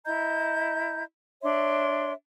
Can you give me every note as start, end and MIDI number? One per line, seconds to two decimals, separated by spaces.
0.06 1.03 64
0.06 1.03 75
0.06 1.03 82
0.06 1.03 91
1.42 2.13 62
1.42 2.13 73
1.42 2.13 76
1.42 2.13 84